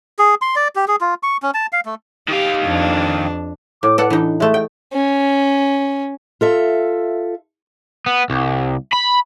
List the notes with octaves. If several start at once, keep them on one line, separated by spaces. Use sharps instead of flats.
G#4
C6
D5
G4
G#4
F4
C#6
C#4
A5
F5
A3
D#3 G4 F5
F2 D4
A2 D6
A4 B4 D5 F#5
E3 D4 D#4
G#3 A3 E5
G5
C#4
F4 A4 E5
B3
C2
B5